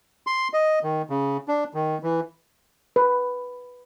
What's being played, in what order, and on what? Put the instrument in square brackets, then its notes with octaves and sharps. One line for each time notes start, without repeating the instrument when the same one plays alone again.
[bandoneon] C6
D#5
D#3
C#3
D4
D#3
E3
[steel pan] B4